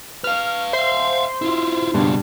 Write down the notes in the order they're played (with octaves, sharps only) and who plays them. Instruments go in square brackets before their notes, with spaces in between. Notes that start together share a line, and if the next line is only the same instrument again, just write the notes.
[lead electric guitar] B4 F5 [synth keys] F6
[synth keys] C5 C6 [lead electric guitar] E5 F5
[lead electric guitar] E4 F4
[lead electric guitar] C#2 B2 [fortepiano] G2